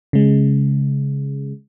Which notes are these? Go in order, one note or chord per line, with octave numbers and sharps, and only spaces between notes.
C#3 G#3